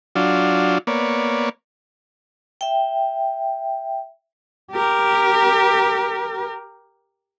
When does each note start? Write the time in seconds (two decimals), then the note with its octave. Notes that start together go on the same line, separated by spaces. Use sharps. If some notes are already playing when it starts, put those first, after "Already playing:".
0.16 F#3 D4 F4
0.87 A#3 B3 C#5 D5
2.61 E5 G5
4.72 G4 A#4